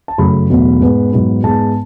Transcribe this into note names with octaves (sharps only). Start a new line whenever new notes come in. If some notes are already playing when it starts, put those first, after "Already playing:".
A5
F#2 C#3 F#3 A3 B5
E2 B2 F#3 A3
G#2 G#3 B3
G#2 F#3 B3
G#2 G#3 B3 A5